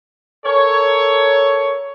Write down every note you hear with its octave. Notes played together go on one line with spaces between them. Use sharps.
A4 A#4 C#5